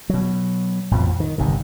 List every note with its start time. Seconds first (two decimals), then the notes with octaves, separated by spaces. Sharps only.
0.09 B2 F#3
0.91 A1 F2 B2 F3
1.20 D#3
1.38 G1 C3 D#3